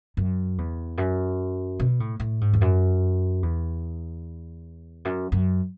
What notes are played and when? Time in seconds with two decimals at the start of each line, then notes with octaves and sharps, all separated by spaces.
0.17 F#2
0.58 E2
0.98 F#2
1.80 B2
2.00 A2
2.20 A2
2.41 G#2
2.53 E2
2.61 F#2
3.43 E2
5.05 F#2
5.32 F#2